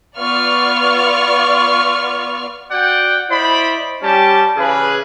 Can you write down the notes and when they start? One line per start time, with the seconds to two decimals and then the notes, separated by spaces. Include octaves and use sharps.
0.18 B3 F4 D5 C#6 F6
2.71 F#4 D5 F#5 G5
3.28 E4 C5 D5 D#5 B5
4.03 G3 C#4 G4 A5
4.56 C#3 E3 G#4 B4 F5